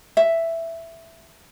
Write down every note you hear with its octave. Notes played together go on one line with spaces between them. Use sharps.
E5